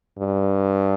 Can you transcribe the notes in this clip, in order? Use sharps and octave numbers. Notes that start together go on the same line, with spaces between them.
G2